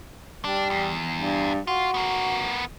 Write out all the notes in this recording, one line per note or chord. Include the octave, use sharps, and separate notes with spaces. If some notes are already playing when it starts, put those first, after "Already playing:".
G3 D4
E2
G2
F4 F#4
B3 A#4